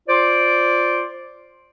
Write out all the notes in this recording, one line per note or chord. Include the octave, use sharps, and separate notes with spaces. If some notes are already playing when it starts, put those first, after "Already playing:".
F4 C5 D5 C6 D6